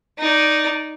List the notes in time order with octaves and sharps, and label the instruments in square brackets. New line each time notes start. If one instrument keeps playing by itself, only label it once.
[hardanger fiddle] D#4 D5